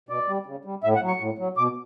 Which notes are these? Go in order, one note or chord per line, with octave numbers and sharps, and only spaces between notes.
B2 D5
G3
C#3
G3
A2 E5
F#5
F#3
C#6
A2
F#3
B2 D6